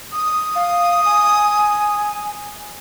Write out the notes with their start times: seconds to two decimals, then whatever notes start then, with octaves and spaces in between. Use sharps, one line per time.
0.12 D#6
0.56 F5
1.05 G#5